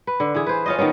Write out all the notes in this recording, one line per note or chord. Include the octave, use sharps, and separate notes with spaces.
B4
D3
E3 G#4
B4 C5
C#4 F4 D#5
D#3 A#3 B3 C#4